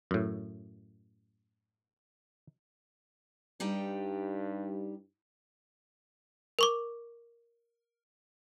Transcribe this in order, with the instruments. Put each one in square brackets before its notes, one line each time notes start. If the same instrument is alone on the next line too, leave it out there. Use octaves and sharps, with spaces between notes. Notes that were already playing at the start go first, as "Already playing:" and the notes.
[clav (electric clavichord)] F#2 A2
[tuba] G2 [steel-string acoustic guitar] G3 D#4 G5
[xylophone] A#4 C#6 D6